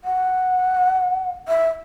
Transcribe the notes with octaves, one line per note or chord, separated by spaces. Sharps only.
F#5
E5